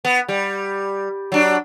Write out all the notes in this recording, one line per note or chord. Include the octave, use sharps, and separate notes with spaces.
B3
G3
F#3 D4